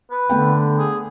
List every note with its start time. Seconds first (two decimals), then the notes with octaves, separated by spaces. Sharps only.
0.11 B4
0.30 D3 A3 B3 G5
0.78 G#4